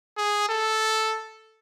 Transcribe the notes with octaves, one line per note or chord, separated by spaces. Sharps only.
G#4
A4